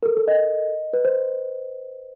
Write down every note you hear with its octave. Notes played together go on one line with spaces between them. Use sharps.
A#4
A4
A4
D#5
B4
C5